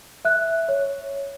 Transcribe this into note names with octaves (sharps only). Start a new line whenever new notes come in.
E5 F#6
C#5